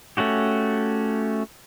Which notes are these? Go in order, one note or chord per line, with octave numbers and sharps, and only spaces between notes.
A3 C#4 F#4 G4